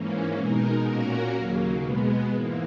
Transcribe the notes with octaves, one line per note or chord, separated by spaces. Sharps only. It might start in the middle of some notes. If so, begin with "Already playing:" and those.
Already playing: G#2 E3 A#3 C#4
B2 G#3 D#4 A#4
A#2 A#3 C#4 F#4 A#4
D#2 C#3 F#3 A#3
B2 G#3 B3
G#2 E3 A#3